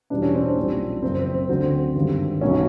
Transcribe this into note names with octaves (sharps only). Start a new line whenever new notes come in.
E2 B2 G3 D4
C#4
C4 D4
B1 A#2 G3
F#1 F#2 C#3 C4
C4
D2 D3 F#3 C4
G#1 G2 D3 G3
B1 B2 F#3 C#4